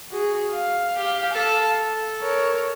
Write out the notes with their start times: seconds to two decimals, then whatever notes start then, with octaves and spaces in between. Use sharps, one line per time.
0.11 F#4 G#4
0.52 F5
0.97 G4
1.33 A4 A5
1.83 A4
2.21 A#4 C#5